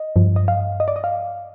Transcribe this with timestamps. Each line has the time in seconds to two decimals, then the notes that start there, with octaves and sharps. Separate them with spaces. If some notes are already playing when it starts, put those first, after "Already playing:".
Already playing: D#5
0.16 G2 F3
0.36 D#5
0.48 F5
0.80 D#5
0.88 D5
0.96 D#5
1.04 F5